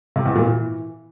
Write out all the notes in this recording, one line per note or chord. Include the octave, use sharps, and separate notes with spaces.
C3
E2
A#2
E3